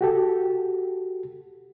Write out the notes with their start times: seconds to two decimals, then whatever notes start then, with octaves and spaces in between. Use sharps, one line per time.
0.01 F#4 G4 A4